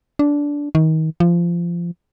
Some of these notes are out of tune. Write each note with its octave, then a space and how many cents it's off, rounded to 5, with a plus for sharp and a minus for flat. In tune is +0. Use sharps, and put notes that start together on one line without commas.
D4 -15
D#3 +30
F3 -20